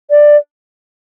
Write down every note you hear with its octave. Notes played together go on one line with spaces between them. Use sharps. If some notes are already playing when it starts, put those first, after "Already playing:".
D5